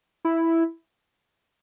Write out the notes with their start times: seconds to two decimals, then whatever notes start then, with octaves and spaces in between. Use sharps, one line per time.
0.25 E4